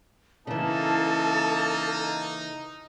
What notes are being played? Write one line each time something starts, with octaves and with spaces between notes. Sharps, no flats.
C#3 E3 A#3 D#4 A4 A5